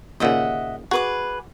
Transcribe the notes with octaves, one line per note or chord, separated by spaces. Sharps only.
D#2 A#2 C#3 D#5 E5 F#5
F#4 G#4 B4 D6